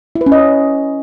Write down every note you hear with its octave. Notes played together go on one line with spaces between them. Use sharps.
E4
B4
C#4
D#5